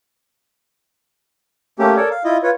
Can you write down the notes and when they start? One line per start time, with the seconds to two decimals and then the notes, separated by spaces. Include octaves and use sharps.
1.79 A3 A#3 C#4 G4
1.96 A4 A#4 C#5 D5
2.11 F5
2.24 E4 F4 D#5
2.43 F4 B4 C#5